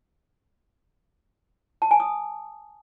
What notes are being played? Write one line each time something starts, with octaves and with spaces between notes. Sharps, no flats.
A5
G#5
D#6